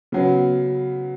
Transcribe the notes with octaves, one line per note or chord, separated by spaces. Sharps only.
C#3 F#3 B3